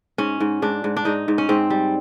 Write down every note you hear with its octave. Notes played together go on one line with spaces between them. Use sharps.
G#2 C#4
G#2
G#2 D4
G#2
D4
G#2 D#4
G#2
C#4
G#2 C4
G3